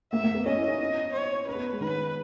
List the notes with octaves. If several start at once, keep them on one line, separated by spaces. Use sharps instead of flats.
A#3 E5
A#3
B3
C#4 D#5
E4
D#4
C#5
C#4 B4
B3
G#3
D#3 B4